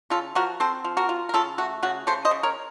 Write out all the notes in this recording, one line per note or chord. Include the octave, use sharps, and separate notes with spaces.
C#3 F4 A4
F3 F#4 A#4
C4 A4 C5
F3
F#4 A#4
F4
A#4
C#3 F4 A4
A3 F#4
C#3 F#4
C#3 A4 C5
C5 D#5
C#3
A#4 C#5